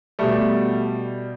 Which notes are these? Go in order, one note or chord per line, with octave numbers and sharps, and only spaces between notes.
B2 G3 A3